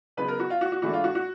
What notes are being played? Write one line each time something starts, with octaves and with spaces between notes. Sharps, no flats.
C#3 F#3 B3 D#4 B4
A#4
F#4
F4
F#4
F#4
G#2 E3 A3 D4 F#4
F4
F#4
F#4